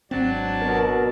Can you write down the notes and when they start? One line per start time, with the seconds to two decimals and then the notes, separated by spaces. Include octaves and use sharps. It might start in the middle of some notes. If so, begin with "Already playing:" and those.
0.11 G#1 F#3 C4 D4 A5
0.62 B2 A#4